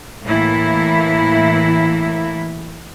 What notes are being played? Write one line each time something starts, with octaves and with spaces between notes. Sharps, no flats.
A2 E3 A#3 E4